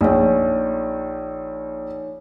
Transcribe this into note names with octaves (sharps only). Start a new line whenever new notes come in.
A#1 D#4 C#5